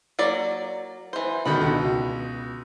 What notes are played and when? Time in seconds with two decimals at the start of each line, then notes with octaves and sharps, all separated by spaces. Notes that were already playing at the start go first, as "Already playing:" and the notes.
0.19 F#3 A#3 D5
1.13 E3 C5
1.45 B2 D3 D#3 B5
1.61 C#2 B2